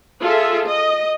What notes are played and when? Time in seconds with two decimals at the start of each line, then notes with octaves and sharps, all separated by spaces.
0.22 F4 G#4 A4 E5
0.67 D#5